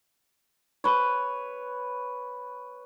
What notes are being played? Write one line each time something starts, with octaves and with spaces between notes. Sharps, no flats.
B4 C#5